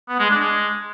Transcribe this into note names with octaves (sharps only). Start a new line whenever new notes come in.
B3
G#3
D4
G#3